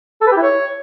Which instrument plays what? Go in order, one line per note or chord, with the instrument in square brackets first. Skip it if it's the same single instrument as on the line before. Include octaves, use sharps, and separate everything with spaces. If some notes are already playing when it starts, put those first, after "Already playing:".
[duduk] A4
B4
G4
E4
C#5